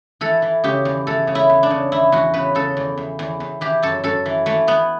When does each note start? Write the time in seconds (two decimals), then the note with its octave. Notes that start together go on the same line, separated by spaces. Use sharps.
0.21 E3 A4
0.42 E3
0.64 C#3 G4
0.85 E2
1.07 E3 A4
1.27 C#3
1.35 E4
1.50 E2
1.63 D4
1.70 C#3
1.92 E2 E4
2.12 E2 F#4
2.34 C#3 B4
2.55 C#3 A4
2.77 E2
2.97 E2
3.19 E2
3.40 E2
3.61 E3 G4
3.82 F#2 A4
4.04 F#2 A4
4.26 E3
4.46 E3 A3
4.67 E3 B3